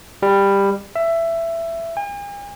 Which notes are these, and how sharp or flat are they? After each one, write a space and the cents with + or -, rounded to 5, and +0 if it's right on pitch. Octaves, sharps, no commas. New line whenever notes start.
G3 +15
E5 +15
G#5 -45